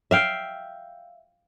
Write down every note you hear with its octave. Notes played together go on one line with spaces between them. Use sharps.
E5 F5 G5